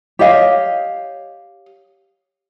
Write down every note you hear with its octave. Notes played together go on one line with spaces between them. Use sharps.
G4 C#5 D#5 F5